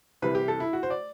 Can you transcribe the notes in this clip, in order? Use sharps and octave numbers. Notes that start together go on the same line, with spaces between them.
C2 C3 E3 G3 B4
G4
A4
E4
F#4
C5
D5